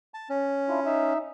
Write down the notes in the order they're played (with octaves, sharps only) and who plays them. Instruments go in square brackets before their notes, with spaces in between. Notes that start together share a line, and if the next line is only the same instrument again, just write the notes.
[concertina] A5
C#4
[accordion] D4 E4 F4
D#4 E5